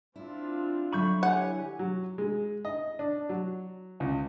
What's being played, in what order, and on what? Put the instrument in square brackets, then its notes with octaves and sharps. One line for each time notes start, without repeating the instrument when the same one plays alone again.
[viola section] C4 D4 F4 [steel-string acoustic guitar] E4
[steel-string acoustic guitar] D3 F#3 E5 [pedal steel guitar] B5 C#6 G6
[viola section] E4 G4 G#5 [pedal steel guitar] C#5 [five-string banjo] F#5
[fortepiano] F#3
G#3
D#5
D4
F#3
C#2